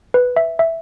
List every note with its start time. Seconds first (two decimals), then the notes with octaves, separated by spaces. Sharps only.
0.14 B4
0.36 E5
0.59 E5